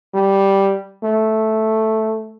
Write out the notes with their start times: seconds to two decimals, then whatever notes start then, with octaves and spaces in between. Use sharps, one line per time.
0.14 G3
1.03 A3